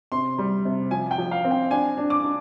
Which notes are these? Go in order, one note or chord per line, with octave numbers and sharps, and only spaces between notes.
C3 C6
G3
C3
F3 G#5
G5
F3
F5
C4
G5
D4 G#5
D4
D6
D4